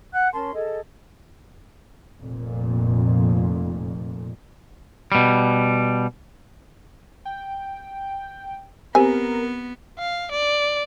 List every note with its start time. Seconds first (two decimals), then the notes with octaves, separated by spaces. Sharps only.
0.13 F#5 F#6
0.33 C#4 A#4 A5 C6
0.53 G#4 A4 D#5
2.20 F1 F2 A#2
5.12 B2 G3
7.25 G5
8.95 B3 C4 G4 A#4 C5 G#5
9.99 F5
10.31 D5